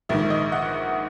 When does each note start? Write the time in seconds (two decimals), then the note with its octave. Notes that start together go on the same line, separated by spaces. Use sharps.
0.09 A#1 G#2 D#3 E5
0.30 D#5
0.52 F#5